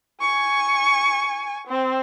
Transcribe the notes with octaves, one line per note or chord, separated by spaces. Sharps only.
G#5 C#6
C4